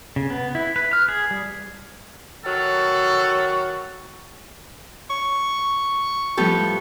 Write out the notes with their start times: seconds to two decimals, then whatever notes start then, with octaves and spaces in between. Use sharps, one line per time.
0.16 C#3
0.30 B3
0.55 E4
0.76 B4
0.93 F6
1.08 G#4
1.31 G3
2.45 D#3 F#3 F#4 A4
5.10 C#6
6.37 A2 F3 G3 B3 G4 A4